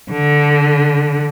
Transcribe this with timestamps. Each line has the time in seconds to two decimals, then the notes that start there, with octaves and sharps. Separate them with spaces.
0.11 D3